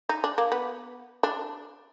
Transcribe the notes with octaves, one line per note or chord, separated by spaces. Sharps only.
D#4
D4
A#3
B3
D4